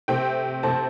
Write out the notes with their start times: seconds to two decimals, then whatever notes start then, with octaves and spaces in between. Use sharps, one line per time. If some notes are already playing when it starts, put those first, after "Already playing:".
0.08 C3 A3 C4 G5
0.63 C3 A3 C4 A5